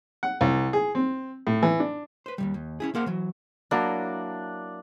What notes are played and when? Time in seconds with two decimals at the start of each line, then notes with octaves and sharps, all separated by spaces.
0.23 F#5
0.41 C2
0.73 G#4
0.95 C4
1.47 A2
1.63 E3
1.80 D4
2.26 B4 C5
2.38 D#2 C3 G3
2.54 D#2
2.80 C#4 E4 G#4
2.95 A#3 G#4 A#4 C5 F5 F#5
3.06 E3 F#3
3.71 F#3 A#3 D4 E4